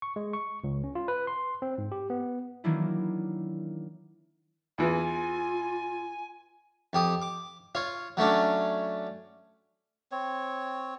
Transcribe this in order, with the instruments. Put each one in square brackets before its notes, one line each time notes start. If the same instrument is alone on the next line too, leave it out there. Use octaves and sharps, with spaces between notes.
[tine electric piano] C#6
G#3
C#6
C#2
C#4
F4
B4
C6
C4
G#2
G4
B3
[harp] D#3 E3 F#3 A#3 D4 E4
[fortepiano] E2 E3 [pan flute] F4 [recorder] G#5
[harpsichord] F2 G4 D#6
D6
F4 C#5
F#3 A3 C#4 D4
[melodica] C4 C#5